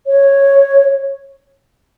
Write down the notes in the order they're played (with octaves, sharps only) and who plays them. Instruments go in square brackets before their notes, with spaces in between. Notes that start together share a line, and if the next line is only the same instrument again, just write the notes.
[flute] C#5